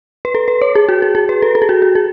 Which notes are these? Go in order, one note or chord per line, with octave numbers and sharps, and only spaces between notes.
B4
A4
B4
C#5
G#4
F#4
G#4
G#4
B4
A4
A4
G#4
F#4
F#4
G#4